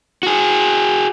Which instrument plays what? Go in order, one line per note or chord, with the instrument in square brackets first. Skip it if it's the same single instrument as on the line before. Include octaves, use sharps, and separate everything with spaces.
[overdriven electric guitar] F#4 G#4